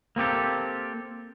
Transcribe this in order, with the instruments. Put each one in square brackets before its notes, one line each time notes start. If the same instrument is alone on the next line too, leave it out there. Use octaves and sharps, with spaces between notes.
[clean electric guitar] A#3 C4 G4 A4